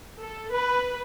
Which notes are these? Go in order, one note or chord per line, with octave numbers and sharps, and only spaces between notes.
A4
B4